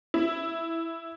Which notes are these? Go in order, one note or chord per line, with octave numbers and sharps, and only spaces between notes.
E4